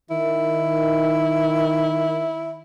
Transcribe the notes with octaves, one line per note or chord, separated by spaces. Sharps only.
D#3 E4